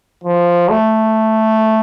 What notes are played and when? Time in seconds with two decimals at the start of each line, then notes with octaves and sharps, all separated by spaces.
0.24 F3
0.70 A3